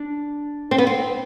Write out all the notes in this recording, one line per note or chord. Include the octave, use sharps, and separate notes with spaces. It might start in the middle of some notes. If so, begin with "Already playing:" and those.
Already playing: D4
C4
B3
C4